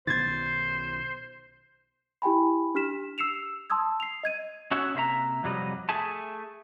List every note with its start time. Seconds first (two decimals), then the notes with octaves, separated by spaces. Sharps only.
0.07 B1 B2 D#3 C5 G#6 A6
2.22 E4 G4 G5 G#5 B5
2.75 D4 G4 F6 B6 E7
3.18 E6 C7 C#7 E7 F7
3.70 A5 C6 D#6 E6 G#6
4.00 C7 F7
4.23 D#5 G#6 D#7
4.71 C#4 D#4 F#4 C#5 E5 F#5
4.94 C3 A#3 C5 E5 A#5
5.43 F2 C3 F#3 G3 D#5
5.89 A3 G#4 E5 G#5 A5